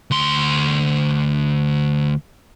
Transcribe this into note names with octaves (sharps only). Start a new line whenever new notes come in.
D2 C6